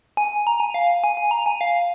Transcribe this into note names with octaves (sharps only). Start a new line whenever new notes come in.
G#5
A#5
G#5
F5
G#5
G#5
A#5
G#5
F5